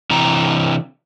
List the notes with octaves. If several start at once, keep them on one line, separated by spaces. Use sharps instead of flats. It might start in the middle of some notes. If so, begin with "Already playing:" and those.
C3 E3 A#5